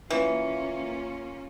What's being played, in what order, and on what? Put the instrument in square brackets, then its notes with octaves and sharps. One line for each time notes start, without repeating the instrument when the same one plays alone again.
[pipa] E3 [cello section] A#3 C#4 F4